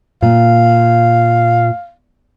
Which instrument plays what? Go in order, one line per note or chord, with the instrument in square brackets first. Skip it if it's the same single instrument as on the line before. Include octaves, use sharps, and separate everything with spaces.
[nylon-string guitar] A#2 [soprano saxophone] F5